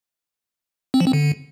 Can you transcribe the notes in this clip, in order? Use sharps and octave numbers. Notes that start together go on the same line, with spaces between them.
C4
F3
C4
D3